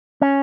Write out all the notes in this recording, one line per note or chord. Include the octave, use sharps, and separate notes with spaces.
C#4